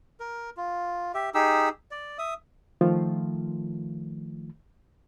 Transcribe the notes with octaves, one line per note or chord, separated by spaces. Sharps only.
A#4
F4
G4 E5
D#4 G4 G#4 E6
D5
E5 D#6
D#3 F3 A3 F4